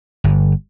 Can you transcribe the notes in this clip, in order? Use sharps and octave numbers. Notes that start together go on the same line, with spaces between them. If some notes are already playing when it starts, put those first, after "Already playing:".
G1